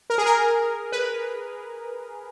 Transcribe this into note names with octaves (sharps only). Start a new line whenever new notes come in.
A#4
G#4
A#4
B4